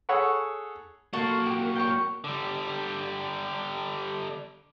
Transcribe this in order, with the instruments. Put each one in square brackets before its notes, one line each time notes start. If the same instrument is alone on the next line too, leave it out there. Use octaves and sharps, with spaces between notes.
[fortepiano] G#4 A4 C#5 F#5 B5 C#6
[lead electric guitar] B1 A#3 [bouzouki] F#4 [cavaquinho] A4 F#5 C6
[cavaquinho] G4
C#5 G5
[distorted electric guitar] D3 G3